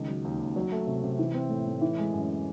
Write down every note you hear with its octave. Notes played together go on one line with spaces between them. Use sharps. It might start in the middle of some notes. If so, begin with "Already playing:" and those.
Already playing: C#2 D#3
F#3
D#2
D#2
F#3
A3
C3
C3
E3
C4
A2
A2
E3
G#3
F#2